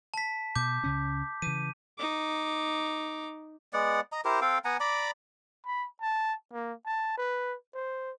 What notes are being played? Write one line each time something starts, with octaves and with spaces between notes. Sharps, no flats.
A5 B6
B2 D6 G6
C#2 C#3 C#4
C#3 E3 D#7
D#4 D6
G#3 B3 D5 F#5
D#5 A#5
E4 G4 A#4 C5
C4 A4 F5 G5
B3 F#5 G#5 A#5
D5 A#5 B5 D6
B5
A5
A#3
A5
B4
C5